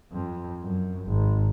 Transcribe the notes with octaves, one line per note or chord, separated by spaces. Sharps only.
F2
F#2
G#1